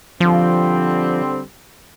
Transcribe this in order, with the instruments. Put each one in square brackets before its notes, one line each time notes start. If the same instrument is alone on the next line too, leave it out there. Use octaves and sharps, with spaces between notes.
[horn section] D3 G3 C4 [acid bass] F3